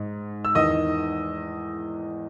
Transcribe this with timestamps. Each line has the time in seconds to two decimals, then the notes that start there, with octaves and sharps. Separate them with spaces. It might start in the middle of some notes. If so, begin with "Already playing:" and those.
Already playing: G#2
0.45 E6
0.55 E2 D#3 D#5 D#6